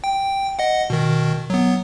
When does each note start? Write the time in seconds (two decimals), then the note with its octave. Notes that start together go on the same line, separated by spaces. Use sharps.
0.04 G5
0.59 D#5 F#5
0.90 B2 D#3
1.50 F#3 B3